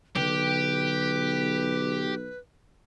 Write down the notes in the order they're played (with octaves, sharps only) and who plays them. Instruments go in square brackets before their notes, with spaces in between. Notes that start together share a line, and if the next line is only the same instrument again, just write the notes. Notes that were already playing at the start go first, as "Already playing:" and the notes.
[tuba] B1 [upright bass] D3 [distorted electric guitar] G4 [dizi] B4